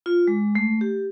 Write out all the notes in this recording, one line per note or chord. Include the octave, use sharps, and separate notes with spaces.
F4
G#3
A3
G4